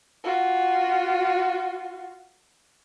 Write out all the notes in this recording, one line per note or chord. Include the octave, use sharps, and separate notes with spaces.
F4 F#4